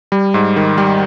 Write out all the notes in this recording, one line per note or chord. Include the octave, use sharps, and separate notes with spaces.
G3
G#2
D#3
G3